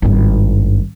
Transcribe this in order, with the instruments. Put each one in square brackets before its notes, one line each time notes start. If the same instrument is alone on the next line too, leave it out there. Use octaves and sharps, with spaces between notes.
[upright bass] G#1 G2